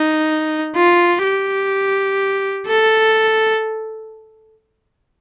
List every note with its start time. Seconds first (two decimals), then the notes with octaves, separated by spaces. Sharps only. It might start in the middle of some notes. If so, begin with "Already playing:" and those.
Already playing: D#4
0.75 F4
1.23 G4
2.67 A4